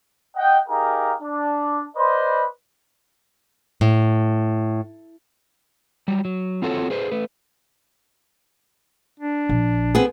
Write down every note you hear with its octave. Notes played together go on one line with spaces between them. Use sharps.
D#5 F#5 G5
D#4 G4 G#4 A#4 F5 A#5
D4
B4 C5 D5 D#5 B5 C6
A2
F#3 G3
F#3
C4 F4 F#4 A4 A#4 C#5
G#4 B4 C5
A3 B4
D4
A#1
B3 C4 G#4